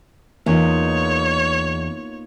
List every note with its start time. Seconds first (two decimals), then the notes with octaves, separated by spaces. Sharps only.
0.46 E2 A#3 D#4 F4 C#5